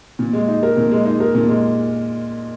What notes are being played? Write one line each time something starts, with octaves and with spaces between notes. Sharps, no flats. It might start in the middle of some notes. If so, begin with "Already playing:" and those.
A#2
G#3
D#4
A#4
A#2
G#3
D#4
A#4
A#2
G#3